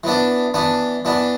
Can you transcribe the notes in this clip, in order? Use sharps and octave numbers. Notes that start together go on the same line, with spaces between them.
E3 B3 D4
E3 B3 D4
E3 B3 D4